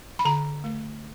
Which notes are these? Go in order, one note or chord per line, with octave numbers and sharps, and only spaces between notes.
B5
D3 A#5
A3